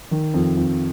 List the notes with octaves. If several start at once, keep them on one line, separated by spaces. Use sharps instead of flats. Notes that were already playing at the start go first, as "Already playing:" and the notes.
D#3
F2
F2